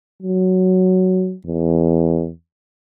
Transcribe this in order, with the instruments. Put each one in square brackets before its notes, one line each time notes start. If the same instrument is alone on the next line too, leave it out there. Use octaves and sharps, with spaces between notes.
[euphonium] F#3
E2